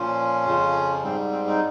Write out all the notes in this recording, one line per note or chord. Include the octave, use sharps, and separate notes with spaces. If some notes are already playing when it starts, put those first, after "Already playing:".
Already playing: A#2 F3 C#4 F4
F2 C#3 F3
G#2 G3 C4
C4
C4 D#4